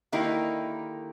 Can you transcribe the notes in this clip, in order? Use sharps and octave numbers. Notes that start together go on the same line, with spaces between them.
D3 D#3 A#3 D#4 E4 G4